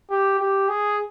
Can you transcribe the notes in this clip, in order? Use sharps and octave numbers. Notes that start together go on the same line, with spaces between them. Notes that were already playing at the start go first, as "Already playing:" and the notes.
G4
G4
G#4